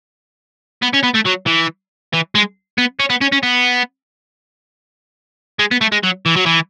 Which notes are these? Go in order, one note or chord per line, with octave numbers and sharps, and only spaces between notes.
B3
C#4
B3
A3
F#3
E3
E3
G#3
B3
C#4
B3
C#4
C#4
B3
G#3
B3
A3
G#3
F#3
E3
F#3
E3